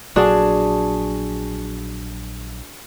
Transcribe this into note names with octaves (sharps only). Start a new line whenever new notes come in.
A#1 F#3 D4 F#4 G#4 A5